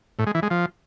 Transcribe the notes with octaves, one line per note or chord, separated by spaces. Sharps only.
A2
G#3
E3
G#3
F3